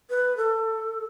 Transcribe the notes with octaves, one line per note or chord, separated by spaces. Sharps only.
B4
A4